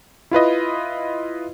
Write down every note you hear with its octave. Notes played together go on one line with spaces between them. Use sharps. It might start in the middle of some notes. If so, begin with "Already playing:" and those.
E4 F4 B4 D#5